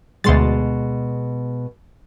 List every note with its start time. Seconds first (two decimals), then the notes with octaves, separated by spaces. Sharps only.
0.24 D2 B2 G#3 C6 A6